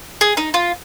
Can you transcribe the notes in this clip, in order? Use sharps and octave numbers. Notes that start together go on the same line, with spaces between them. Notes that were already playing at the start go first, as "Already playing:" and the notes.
G#4
D#4
F4